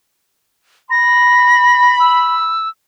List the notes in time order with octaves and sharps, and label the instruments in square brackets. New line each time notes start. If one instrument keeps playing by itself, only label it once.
[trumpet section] B5 [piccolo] A#6
[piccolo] E6